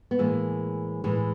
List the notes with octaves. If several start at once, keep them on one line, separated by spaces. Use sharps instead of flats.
B3
A2 E3 G#3 A#3
A2 E3 G#3